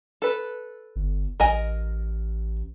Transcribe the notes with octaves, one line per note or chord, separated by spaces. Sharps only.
A4 B4
G1
A1 A#4 D#5 G#5